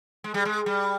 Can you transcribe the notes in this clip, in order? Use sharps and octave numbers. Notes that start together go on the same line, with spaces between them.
G#3
G3
G#3
G3